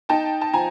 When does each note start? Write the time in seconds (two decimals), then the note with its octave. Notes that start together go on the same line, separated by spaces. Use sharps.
0.09 D#4 G5 A5
0.41 A5
0.53 F3 G#5 A#5